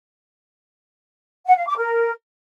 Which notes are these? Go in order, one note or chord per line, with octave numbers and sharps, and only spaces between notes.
F#5
F5
D6
A#4